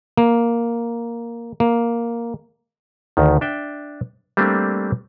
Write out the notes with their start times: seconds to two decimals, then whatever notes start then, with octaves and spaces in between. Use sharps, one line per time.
0.17 A#3
1.60 A#3
3.17 D2 D#3
3.41 D4 E5 G5
4.37 G3 A3 A#3 C4 D4